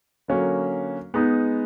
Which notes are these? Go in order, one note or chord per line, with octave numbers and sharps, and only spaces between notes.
D3 F#3 A#3 C#4
G#3 B3 D#4